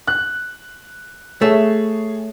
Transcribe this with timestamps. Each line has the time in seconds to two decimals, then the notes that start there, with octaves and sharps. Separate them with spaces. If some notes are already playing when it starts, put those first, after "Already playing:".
0.07 F#6
1.42 A3 G#4 C#5